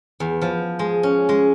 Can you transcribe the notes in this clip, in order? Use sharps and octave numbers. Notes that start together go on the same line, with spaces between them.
E2
F3
G#3
C#4
G#3